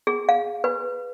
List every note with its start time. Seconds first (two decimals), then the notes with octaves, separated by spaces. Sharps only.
0.07 G#4
0.29 F5
0.64 B4